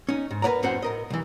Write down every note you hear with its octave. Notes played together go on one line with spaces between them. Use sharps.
C#4 D#4
G#2
A#4 B4 C#5 D5 F#5 A#5
F#2 A2 C#4 F#4 C5 F#5
A2 A#4 D#5
C2 E3